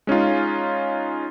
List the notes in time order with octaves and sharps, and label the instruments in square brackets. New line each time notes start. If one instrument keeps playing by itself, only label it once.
[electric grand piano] G#3 C#4 D#4 F4